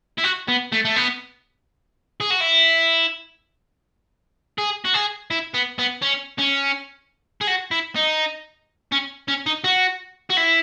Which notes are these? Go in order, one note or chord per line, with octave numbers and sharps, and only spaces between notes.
E4
F#4
B3
A3
A3
B3
G#4
F#4
E4
G#4
F#4
G#4
E4
B3
B3
C#4
C#4
G#4
F#4
E4
D#4
C#4
C#4
D#4
F#4
F#4
E4